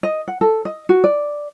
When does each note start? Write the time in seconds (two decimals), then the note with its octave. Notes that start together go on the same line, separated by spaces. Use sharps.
0.03 D#5
0.28 F#5
0.41 A4
0.65 D#5
0.89 F#4
1.04 D5